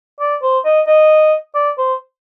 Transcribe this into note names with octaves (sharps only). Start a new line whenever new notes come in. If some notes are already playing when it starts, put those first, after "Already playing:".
D5
C5
D#5
D#5
D5
C5